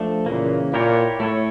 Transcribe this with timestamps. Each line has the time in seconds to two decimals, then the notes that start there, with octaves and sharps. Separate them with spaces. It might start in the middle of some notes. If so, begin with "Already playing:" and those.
Already playing: F3 A3 D4 A4
0.26 A#2 C#3 E3 A#3
0.73 A#2 A#3 E4 G4 A#4 C#5
1.20 A2 A3 E4 A4 C#5